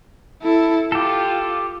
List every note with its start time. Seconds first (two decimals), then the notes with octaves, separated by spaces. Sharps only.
0.43 E4 A4
0.92 F4 G4 A4